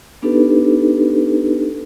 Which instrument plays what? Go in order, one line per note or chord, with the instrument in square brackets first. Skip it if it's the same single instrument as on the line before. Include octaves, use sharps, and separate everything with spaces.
[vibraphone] B3 D4 D#4 G4 A4 B4